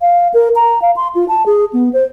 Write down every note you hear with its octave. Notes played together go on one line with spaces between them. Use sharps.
F5
A#4
A#5
F5
C6
F4
A5
G#4
B3
C5